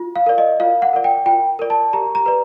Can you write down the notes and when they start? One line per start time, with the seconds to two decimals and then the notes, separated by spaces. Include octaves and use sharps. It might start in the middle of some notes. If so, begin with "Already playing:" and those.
Already playing: F4
0.16 F5
0.26 A#4 D5
0.38 D#5
0.60 F4 F5
0.82 F#5
0.93 A#4 D5
1.04 G5
1.26 F4 G5
1.59 A#4 D5
1.70 A5
1.93 G4 A#5
2.15 A#5
2.26 B4 D5